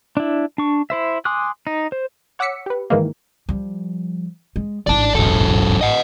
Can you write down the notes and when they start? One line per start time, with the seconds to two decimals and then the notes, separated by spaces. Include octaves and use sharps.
0.17 D4 E4
0.58 D4 C#6
0.90 E4 C5 E5
1.25 G#5 C6 D6 D#6 F#6
1.67 D#4
1.92 C5
2.39 C#5 F#5 D6 E6 B6 C#7
2.66 G4 B4
2.90 G#2 D#3 E3 G#3 A#3
3.49 F3 G3
4.56 G#3
4.87 A1 G#2 D5 A5
5.15 E1 F#2 A4
5.81 D#5 F#5